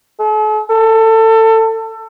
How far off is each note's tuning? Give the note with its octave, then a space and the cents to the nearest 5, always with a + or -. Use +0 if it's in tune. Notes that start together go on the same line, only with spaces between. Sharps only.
A4 -45
A4 +25